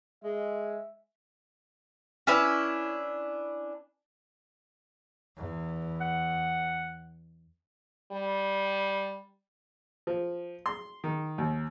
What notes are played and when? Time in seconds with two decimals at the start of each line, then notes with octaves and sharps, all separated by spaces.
0.24 G#3 E5
2.27 C#4 D4 E4 B4
5.37 E2
6.01 F#5
8.12 G3
10.07 F3
10.66 C6
11.04 D#3
11.38 D#2